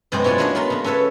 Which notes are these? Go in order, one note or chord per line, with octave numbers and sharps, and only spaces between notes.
F#2 B2 G#3 C4 G#4 C5
C#4 E4 F4 D5 F#5 G#5
G#3 A#3 D4 F#4 C#5 D#5
B3 F4 A#4 B4 A#5
C#3 A#3
C#4 A4 B4 C#5 E5